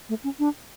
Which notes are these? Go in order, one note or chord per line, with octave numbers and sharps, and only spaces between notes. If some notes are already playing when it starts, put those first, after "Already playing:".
A3
C#4
D4